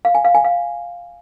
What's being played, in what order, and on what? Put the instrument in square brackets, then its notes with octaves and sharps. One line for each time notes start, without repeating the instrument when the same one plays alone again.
[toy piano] F5
G#5
F5
G#5
F5